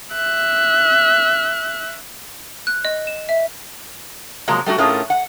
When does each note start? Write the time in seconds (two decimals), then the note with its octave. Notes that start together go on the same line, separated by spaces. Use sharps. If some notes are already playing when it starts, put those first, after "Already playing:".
0.13 E5 F#6
2.67 F#6
2.85 D#5
3.07 E7
3.29 E5
4.48 C3 F3 F#3 G#3 A#3
4.66 G3 A3 D#4 F#4
4.78 A2 A3 C#4 F4 G#4 A#4
5.10 F#5